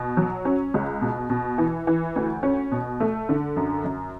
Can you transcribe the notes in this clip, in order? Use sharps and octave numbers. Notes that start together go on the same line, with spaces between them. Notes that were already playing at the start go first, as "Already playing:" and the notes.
Already playing: B2
F#3
C#4
C#2
B2
B2
E3
E3
D2
C#4
B2
A3
D3
F#2
F#2